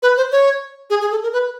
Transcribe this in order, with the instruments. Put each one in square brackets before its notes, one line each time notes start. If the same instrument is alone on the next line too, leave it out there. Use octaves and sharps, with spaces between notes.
[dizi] B4
C5
C#5
G#4
G#4
A4
A#4
B4